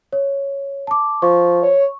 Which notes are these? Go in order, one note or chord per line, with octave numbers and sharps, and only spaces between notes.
C#5
A5 D6
F3 C#6
C#5